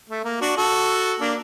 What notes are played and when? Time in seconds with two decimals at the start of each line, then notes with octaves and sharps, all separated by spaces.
0.10 A3
0.24 A#3
0.41 D4 F#4
0.56 F#4 A4
1.21 A#3 D4